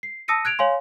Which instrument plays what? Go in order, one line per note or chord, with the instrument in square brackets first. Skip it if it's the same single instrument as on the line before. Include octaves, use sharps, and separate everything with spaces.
[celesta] C7
A5 D#6 E6 A#6 C#7 D#7
F#6 G#6 D7 F7
C#5 F5 G#5 C6